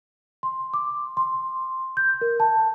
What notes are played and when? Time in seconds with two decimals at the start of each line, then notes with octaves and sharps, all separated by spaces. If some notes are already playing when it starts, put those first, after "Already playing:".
0.43 C6
0.74 D6
1.17 C6
1.97 G6
2.21 A#4
2.40 A5